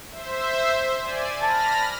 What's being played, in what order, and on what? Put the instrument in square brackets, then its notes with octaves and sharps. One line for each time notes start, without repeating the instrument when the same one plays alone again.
[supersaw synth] C5 E5
D5 G#5
[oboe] A5 [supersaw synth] B5 F6 A#6